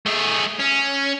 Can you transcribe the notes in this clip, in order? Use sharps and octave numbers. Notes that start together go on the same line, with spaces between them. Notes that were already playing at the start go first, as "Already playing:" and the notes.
A3 G#4
C#4